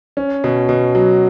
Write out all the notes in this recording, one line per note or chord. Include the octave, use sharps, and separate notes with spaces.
C#4
B2
B2
F#3